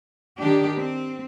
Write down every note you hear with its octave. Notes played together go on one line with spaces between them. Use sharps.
D#3 D4 G4
C4